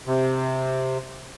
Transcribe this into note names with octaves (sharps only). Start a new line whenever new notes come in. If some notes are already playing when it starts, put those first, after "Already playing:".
C3